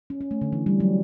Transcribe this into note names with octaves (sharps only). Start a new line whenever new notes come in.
C#4
C#4
A3
D3
E3
G3
F#3